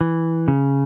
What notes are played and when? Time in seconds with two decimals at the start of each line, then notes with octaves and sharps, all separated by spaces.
0.01 E3
0.48 C#3